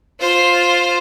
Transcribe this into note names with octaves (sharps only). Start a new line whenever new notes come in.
F4 C5